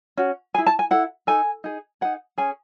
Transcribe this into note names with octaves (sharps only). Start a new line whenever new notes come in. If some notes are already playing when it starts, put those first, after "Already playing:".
C#4 F#4
E4 G#4 G#5
A5
G#5
E4 A4 F#5
D#4 A4 G#5
D#4 G#4
D#4 G#4 F#5
C#4 G#4 G#5